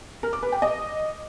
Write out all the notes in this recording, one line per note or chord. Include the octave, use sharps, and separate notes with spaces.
A#4
D6
B4
G5
D#5